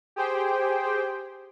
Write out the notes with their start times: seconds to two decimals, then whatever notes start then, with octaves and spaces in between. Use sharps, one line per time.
0.16 G4 G#4 C5 G5